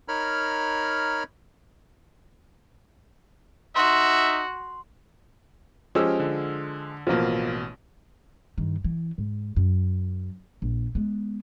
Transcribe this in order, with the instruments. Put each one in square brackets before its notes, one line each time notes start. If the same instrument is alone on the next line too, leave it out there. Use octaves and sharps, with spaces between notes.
[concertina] D#4 A#4 C#5 B5 F6
[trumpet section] D#4 E5 [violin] F#4 [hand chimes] C6
[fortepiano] F3 G#3 [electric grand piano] C#4 G4 E6
[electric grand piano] D3
[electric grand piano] A1 B2 [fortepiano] F3 A#3
[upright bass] G2 D#3
E3
G#2
F#2
A#1
G#3 B3